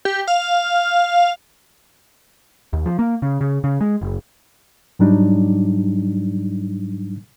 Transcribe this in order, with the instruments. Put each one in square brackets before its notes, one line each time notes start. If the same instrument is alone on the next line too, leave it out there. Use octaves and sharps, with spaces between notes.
[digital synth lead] G4
F5
[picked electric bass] D#2
F3
A#3
C#3
C#3
C#3
G#3
F#1
[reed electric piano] G#2 F#3 G3 D4 D#4